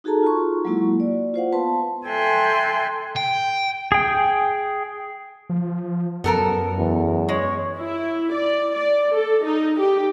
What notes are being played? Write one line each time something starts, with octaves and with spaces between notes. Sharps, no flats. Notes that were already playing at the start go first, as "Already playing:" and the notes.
D#4 F#4 G#4 A4 A5 A#5
F4 F#4 C6 C#6
F#3 G#3 A#3 E4 F#4
D5
F4 C5 F5 F#5
B3 B4 A5 C6
A4 E5 G5 G#5 C6 F#6
G5
G#4 G5
F3
F#2 B3 A4 A#4
E2
G#3 C#5
E4
D5
D5
A4
D#4
G4